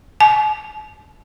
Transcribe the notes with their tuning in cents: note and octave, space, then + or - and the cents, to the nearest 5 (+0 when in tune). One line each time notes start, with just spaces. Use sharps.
G#5 +45